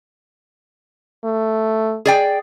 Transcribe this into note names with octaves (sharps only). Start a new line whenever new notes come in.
A3
G#4 D5 G5